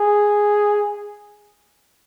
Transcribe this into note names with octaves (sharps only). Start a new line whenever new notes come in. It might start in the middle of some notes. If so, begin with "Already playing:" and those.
Already playing: G#4